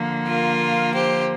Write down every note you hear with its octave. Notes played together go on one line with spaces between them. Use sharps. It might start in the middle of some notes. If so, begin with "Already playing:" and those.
Already playing: D3 F3 A#3
F4 A#4
G4 C5